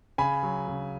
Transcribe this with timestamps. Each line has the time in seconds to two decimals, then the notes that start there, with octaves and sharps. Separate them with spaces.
0.18 C#3 G#5 B5
0.43 F#3
0.68 C#3